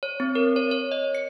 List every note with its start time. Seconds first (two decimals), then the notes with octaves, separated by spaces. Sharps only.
0.03 C#5
0.20 C4
0.35 A#4
0.56 C#5
0.71 C#5
0.92 D#5
1.15 C#7